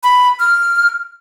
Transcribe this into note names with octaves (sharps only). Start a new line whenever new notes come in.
B5
F6